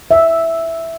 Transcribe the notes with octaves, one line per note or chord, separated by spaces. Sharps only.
E5